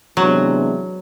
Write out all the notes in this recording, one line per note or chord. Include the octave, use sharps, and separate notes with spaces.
C3 E3 F#3 G#3 B3 D4